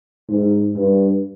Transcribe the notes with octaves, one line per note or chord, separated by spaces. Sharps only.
G#2
G2